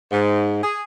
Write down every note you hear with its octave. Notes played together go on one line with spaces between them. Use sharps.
G#2
G#4